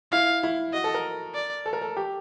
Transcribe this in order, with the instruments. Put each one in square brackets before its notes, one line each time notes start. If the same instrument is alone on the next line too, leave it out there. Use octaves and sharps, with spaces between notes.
[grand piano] E4 [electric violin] F5
[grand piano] E4
[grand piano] F#4 [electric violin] D#5
[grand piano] A4
A#4
[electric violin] D5
[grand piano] A4
A#4
A4
G4